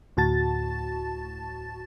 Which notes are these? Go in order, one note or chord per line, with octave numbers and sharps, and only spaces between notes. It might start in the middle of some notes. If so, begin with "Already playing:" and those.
D2 A2 F#4 A5 A6